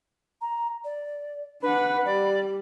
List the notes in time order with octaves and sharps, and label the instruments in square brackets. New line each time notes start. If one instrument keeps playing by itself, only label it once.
[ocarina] A#5
D5
[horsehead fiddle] D4 F#5 [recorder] B4 [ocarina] B5
[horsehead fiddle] G3 [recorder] D5